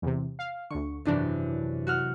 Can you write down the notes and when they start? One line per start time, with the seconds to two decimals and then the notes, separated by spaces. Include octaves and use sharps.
0.02 E2 C3
0.39 F5
0.70 D2 D3 C#6
1.05 G#1 F#2 C3 E3 D4
1.87 F#4 F#5 F6